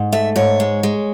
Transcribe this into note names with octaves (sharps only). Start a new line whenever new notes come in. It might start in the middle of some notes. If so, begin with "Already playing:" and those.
Already playing: G#2
A3 E5
G#2 C#5
G#3
G#3